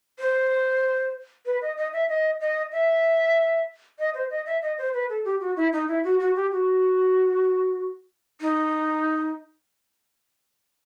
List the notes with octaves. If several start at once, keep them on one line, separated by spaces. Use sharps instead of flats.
C5
B4
D#5
D#5
E5
D#5
D#5
E5
D#5
C5
D#5
E5
D#5
C5
B4
A4
G4
F#4
E4
D#4
E4
F#4
F#4
G4
F#4
D#4